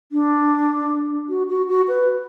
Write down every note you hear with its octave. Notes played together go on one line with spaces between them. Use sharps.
D4
F#4
F#4
F#4
B4